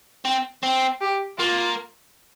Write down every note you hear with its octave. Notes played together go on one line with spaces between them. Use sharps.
C4
C4
G4
A#3 F4